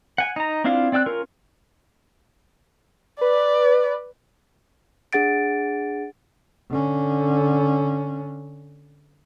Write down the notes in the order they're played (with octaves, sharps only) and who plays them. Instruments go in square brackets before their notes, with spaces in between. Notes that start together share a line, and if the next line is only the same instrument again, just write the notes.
[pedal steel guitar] F#5 G#5
D#4 A#5
C4 D4 E4 F4 F5
C4 D5 G5 E6 F#6
C#4 F4 A#4
[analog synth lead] B4 [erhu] D5
[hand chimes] D4 G#4 F#5 A6 D7
[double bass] D3 C#4